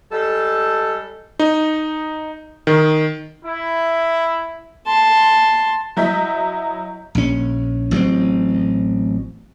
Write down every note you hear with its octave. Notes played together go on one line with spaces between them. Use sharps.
G3 G#3 A4
D#4
D#3
E4
A5 C6
F#3 E4 D#5 G6 B6
A#1 C#4
A1 F#3 B3 C4